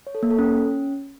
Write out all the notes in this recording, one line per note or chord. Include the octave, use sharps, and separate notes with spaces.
C#5
A4
A#3
A4
C#4